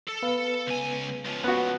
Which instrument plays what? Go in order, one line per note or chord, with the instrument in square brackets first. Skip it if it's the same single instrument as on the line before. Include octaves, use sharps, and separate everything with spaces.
[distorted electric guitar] A4
[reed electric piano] B3 B4 F5
[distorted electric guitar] C#2 G#5
C#2 F3
[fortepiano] B3 F#4